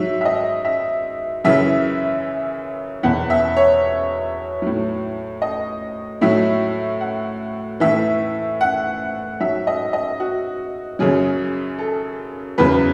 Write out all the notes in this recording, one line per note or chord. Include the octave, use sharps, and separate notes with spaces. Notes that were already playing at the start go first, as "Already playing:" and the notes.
Already playing: G#2 F#3 E5
E5
D#5
E5
F#2 C#3 E3 E5
E2 B2 F#3 F#5
E5
C#5
A2 F#3
D#5
A2 F#3 E5
F#5
A2 E3 E5
F#5
G#2 F#3 E5
D#5
D#5
F#4
F#2 C#3 F#3 G#4
A4
E2 C#3 F#3 B4